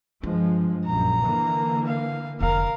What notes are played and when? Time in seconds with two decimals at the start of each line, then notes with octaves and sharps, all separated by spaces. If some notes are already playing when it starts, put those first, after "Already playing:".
0.23 G2 F3 G#3 D4
0.86 A#1 F#2 A#5
1.23 D3 E3 A#3
1.86 F5
2.40 F1 D3 A#4 F5